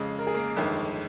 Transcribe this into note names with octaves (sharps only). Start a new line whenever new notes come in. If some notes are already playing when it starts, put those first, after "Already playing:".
Already playing: F2 C#3 G#3
A#4
G#4
A#3 A#4
G1 F2 D#3 G#3